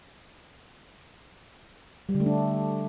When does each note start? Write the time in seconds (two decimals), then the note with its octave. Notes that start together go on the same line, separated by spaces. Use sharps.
2.09 G3
2.15 D3
2.20 A3
2.26 D4